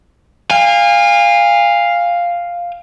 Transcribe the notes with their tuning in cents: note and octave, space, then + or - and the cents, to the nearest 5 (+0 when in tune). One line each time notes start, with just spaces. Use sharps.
F5 +0 G#5 -35